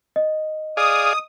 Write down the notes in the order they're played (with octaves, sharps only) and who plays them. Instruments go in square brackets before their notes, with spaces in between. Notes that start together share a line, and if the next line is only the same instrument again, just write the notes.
[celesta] D#5
[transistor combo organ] G#4 D5 F5 [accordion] D#6